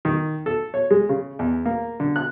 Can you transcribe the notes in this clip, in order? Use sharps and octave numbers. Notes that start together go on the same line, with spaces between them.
D#3
A4
C#5
G#3
C#3
E2
A#3
D3
F#6